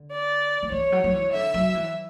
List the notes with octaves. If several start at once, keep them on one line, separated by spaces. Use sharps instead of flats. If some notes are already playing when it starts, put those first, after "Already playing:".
Already playing: D3
D5
D3
E3 C#5
F#3
F#3
E3
D3 E5
F#3
E3